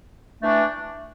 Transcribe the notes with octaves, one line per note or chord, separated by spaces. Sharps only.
E3 A3 D4